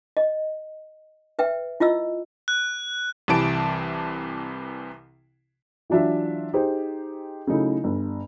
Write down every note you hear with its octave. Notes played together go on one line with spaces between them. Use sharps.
D#5
B4 E5 G5
E4 F4 D#5 E6
F#6
C2 C3 E3 A5 D7
E3 F#3 D4 F4 E5
D#4 G4 G#4 C5
C#3 F#3 A3 D#4 E4
G1